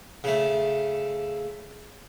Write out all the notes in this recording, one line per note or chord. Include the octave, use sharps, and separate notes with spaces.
C#3 A3